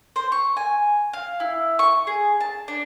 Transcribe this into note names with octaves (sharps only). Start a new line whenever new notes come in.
C5
C#6
G#5
F5
E4
C#6
G#4
A5
D4